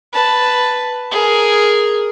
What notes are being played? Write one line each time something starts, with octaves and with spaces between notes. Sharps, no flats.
B4 A5
G#4 A#4